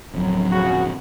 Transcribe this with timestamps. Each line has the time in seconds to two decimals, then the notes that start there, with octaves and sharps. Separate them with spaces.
0.14 D1 F2 F#3
0.52 C#3 F#4